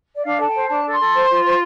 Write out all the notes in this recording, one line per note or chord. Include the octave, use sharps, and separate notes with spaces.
D5
D4 F5
A4
G5
C5
D4 A5
A4
C6
A4
C5
F4
C5